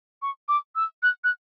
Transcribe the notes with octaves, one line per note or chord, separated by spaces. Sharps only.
C#6
D6
E6
F#6
F#6